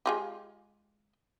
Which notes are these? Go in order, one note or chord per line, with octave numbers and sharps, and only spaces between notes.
G#3 F4 G4